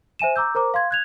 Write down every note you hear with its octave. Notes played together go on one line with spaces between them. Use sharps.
C5 E5 G#5 D#7 E7
A#5 D6 E6 G6
A#4 C5 A#5 D6
F5 C6 G#6
F#6 G#6 F7